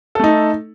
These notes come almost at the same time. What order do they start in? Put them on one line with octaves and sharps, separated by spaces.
A4 A3 D#4